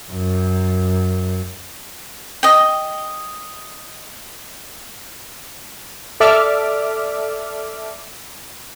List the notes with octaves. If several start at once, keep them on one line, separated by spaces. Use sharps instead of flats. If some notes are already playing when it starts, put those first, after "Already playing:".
F#2
D#5 G5
A4 D5 E5 D6 F6